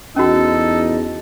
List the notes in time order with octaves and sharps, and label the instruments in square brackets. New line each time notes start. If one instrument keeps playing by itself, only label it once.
[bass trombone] E2 [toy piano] C#4 F#4 [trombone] D#4 [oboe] A4